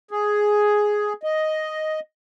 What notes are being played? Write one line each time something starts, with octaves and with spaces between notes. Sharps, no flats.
G#4
D#5